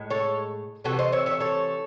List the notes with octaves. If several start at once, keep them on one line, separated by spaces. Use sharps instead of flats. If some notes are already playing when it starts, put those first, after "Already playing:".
Already playing: A2 G#3
A4 C#5
C3 E3 A3 F#4 A4
C5 D#5
C#5 E5
C#5 E5
A4 C#5